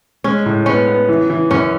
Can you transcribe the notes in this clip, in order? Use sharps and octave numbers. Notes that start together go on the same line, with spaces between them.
G#3 C#4
A2
B3 C#4
B3
E3
E3
F#2 C#4